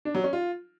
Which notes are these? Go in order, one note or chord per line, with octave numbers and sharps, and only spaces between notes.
D4
F#3
C#4
F4